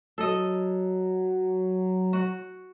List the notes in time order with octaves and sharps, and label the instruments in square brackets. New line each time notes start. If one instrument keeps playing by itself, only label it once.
[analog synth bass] F#3 [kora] A4 D#5
[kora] F#4